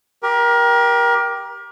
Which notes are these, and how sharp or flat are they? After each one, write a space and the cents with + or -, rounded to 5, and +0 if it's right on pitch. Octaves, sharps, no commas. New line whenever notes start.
G4 +0 A#4 +30